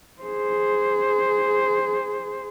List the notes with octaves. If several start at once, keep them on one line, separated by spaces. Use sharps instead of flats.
G#4 C5